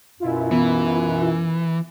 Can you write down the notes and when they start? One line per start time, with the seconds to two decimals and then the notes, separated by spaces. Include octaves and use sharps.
0.20 F#2 B2 E4 F4
0.51 E3 B3